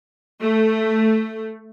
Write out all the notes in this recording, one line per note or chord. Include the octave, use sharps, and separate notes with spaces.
A3